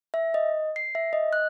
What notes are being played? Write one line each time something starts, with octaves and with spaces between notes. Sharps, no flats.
E5
D#5
C7
E5
D#5
F#6